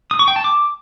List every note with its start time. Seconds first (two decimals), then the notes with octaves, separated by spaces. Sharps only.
0.11 D#6
0.19 C#6
0.28 G5
0.36 A5
0.44 D6